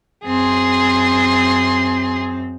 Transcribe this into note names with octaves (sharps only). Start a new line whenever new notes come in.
F#2 C4 G#4 C6